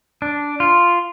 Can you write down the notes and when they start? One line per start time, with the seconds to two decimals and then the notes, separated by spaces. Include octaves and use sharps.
0.22 D4
0.60 F4